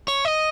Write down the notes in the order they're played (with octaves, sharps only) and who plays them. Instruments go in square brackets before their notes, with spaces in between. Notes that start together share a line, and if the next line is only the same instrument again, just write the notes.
[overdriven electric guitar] C#5
D#5